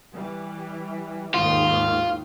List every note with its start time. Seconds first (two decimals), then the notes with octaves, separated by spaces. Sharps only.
0.13 E3 G3
1.34 D#2 G#2 D#3 F4